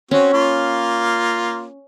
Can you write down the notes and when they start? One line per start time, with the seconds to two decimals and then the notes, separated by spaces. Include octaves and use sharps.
0.11 C4 C#4 F#4
0.33 A#3 F4